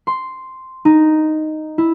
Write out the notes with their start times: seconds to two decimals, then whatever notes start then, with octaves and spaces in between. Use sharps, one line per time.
0.07 C6
0.85 D#4
1.78 E4